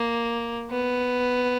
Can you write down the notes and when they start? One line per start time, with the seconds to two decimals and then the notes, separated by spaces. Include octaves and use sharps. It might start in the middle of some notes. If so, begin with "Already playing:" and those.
Already playing: A#3
0.71 B3